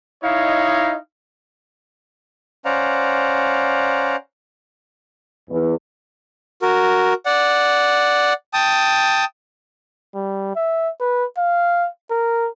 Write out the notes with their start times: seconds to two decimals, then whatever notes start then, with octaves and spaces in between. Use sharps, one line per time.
0.24 D#4 E4 C#5 D#5 F5
2.65 C#4 C5 D5 F5 F#5 A#5
5.49 E2
6.62 F#4 A#4
7.26 D5 F#5
8.54 G5 A5 D#6
10.15 G3
10.56 E5
11.00 B4
11.38 F5
12.11 A#4